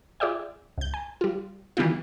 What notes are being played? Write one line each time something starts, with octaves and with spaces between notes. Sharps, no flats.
F4 G#4 D5 E5 G5
C#2 G6
G#5
G3 F4
D#3 E3 G3 B3 D#4 F4